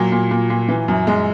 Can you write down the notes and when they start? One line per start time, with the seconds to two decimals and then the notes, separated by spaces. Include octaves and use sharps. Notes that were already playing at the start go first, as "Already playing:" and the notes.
Already playing: A#2 F#3
0.12 A#2
0.31 A#2
0.50 A#2
0.68 E3
0.88 F#2
1.07 F#2 G#3